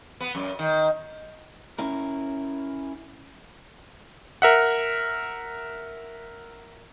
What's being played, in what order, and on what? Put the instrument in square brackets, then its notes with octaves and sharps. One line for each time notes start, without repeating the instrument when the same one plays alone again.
[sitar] B3
F#2
D#3
[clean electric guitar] C#4 E4 A#4
[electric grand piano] A#4 E5 F#5